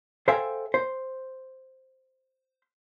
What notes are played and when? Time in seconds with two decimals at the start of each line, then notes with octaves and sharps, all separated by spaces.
0.28 A4 C5 E5 F5 G5 G#5
0.74 C5